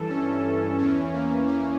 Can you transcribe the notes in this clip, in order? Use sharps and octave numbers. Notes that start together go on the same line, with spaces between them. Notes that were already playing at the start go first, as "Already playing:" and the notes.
Already playing: G2 E3 A4
C#4
E2 E3 C#4
A#3
C#4